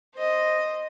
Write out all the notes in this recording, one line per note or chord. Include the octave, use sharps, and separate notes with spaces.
C5 D#5